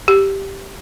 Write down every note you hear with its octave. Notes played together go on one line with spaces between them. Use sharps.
G4